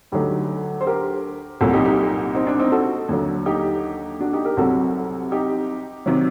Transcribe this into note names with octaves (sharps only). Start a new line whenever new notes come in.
D2 D3 F#3 D#4 G4
C5
G4 A#4
C2 A#2 F#3 F#4 A4
D#4 G4
D#4 G4
C4 D#4
D4
C4 D#4
F#4 A4
D#2 D3 F#3
D#4 G4
D4 F#4
D#4 G4
G4 A#4
C2 C3 F#3 F#4 A4
D#4 G4
C3 D#3 F#3